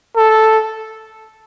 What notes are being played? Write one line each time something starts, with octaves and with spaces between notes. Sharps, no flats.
A4